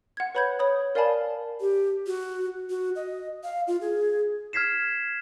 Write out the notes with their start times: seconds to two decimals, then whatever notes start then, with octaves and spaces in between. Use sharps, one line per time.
0.17 F#5 G#6
0.35 B4 C#5 B5 G6 G#6
0.59 C#5 B5 D#6
0.95 A#4 D5 F5 G#5 A5 B5
1.61 G4
2.07 F#4
2.70 F#4
2.96 D#5
3.44 F5
3.67 F4
3.81 G#4
4.53 F6 G#6 B6 C7 E7